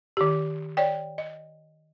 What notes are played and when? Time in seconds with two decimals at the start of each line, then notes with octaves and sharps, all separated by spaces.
0.17 D#3 G4
0.77 C#5 D5 G5
1.18 D#5